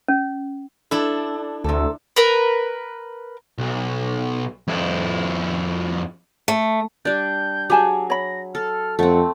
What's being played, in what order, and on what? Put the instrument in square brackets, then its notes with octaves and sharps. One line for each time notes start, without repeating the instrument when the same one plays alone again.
[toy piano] C#4
[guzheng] D4 E4 [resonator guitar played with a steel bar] A4
[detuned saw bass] D2 [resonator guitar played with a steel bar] C3 A4
[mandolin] A#4 B4
[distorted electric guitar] B1
F2 E4
[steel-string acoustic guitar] A3
[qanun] G3 D4 [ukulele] D5 [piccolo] G6
[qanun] F#3 G#4 [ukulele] G4 G#5 A5
[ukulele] C#5 B5 [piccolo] A#6
[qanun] A4 [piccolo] F6
[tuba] F2 [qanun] A3 C4 [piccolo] F#5